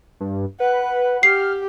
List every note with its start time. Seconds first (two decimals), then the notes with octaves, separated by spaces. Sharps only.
0.20 G2
0.60 B4 F#5
1.23 G4 F6 C7